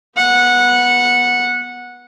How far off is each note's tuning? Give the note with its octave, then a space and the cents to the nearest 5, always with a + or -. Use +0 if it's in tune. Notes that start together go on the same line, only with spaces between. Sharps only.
B3 -15 F#5 -15